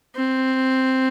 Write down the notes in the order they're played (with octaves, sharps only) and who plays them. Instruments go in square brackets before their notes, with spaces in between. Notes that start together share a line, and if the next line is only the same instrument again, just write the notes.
[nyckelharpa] C4